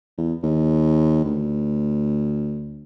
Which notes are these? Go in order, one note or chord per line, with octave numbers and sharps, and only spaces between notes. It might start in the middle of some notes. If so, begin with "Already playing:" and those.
E2
D#2
D2